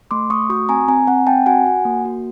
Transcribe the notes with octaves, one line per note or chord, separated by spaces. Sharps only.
A3 C6 D6
A3 C#6 D#6
F#4 C#6 D#6
C4 G#5 A#5
C4 G#5 A#5
C4 F#5 G#5
C4 G5 A5
F#4 F#5 G#5
F#4
A#3
F#4